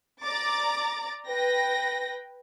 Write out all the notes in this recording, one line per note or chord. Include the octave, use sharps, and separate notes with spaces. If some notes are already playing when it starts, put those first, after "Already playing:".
D5 A#5 D6 A6
B4 G5 A#6